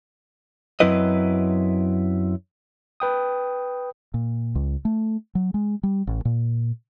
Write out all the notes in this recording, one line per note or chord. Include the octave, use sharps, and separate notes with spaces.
F#2 F#3 C4 E4 B4 D#5
B4 G5 D#6
A#2
C#2
A3
F#3
G#3
G3
A1
A#2